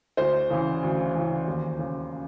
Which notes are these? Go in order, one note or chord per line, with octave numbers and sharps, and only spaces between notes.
D2 C5
C#3 E3
D2
C#3 E3
D#2
C#3